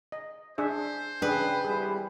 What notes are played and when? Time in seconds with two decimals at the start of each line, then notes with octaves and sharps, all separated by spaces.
0.12 D#5
0.58 D4 G#4 C5 E5
1.22 C#3 D4 G#4 B4 G5
1.65 G#1 E2 G3 G#4